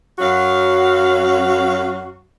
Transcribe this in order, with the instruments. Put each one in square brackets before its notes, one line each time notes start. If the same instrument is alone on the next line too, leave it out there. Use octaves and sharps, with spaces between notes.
[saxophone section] F#2 F#3 F#4 F5